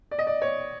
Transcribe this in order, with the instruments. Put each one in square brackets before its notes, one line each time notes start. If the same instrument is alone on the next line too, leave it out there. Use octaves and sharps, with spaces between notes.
[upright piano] D5
D#5
D5
C#5